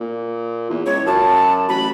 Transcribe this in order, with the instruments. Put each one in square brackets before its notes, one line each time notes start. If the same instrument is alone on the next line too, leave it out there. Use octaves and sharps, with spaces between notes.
[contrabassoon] A#2
E2
[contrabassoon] C#2 [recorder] C#5
[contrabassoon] F#2 [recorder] A5
[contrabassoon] A1 [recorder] B5